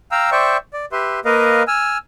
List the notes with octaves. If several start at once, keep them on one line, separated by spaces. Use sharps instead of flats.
F5 G5 A#5 E6
C5 D5 E5 G5 C#6
D5
G4 B4 E5 C6
A#3 A#4 B4 D#5 F5
G#5 E6 F6